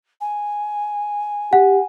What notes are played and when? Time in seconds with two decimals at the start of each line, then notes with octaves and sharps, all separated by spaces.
0.20 G#5
1.53 G4 F#5